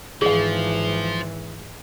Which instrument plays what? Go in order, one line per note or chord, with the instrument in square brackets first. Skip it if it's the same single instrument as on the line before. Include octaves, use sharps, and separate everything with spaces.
[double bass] G#1 E3 [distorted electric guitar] F3 [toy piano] G#4 F5